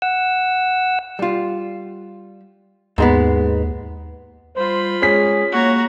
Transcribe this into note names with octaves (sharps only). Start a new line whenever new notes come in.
F#5 E6
G3 F4
D#2 G#2 G#3 B3
G3 F4 C5 B5
G#3 C#4 G#4 B6
A#3 F#4 C#5 A#5